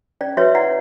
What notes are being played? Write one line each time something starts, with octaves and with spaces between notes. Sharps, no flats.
C#4 D5
F#4 B4 C#5 E5
E4 D5 F#5